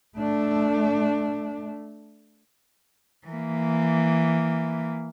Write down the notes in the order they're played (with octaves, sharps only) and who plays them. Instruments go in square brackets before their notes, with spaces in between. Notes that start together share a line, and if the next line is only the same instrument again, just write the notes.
[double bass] A3 D4
[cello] E3 A#3